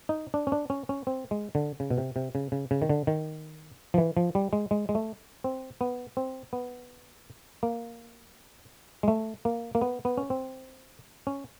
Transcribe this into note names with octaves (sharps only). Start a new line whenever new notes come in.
D#4
D4
C#4
D4
C#4
C#4
C4
G#3
D3
C#3
B2
C3
C3
C#3
C#3
C#3
D#3
D3
D#3
F3
E3
F3
G3
G#3
G#3
G#3
A3
C4
B3
C4
B3
A#3
G#3
A3
A#3
A#3
B3
B3
C#4
C4
C#4